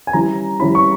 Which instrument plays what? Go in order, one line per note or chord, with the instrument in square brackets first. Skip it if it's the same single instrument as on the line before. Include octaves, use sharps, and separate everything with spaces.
[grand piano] G#5
E3 G3 C#4 E4 A#5
E3 G3 C#4 E4 B5
C#6